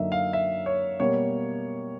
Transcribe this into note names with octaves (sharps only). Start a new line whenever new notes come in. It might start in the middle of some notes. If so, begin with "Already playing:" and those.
Already playing: F#2 D3 F#3 A#3 D#4 E5
F5
E5
C#5
B2 G3 A#3 C#5